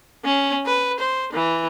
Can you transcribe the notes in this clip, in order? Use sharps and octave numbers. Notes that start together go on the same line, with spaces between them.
C#4
B4
C5
E3